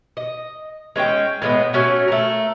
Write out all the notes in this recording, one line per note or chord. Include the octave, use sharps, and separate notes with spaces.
D#5
G#3 C#4 E4 G5
A2 G#3 A3 B3
A3 C#4 F#4 G#5
A3 A#4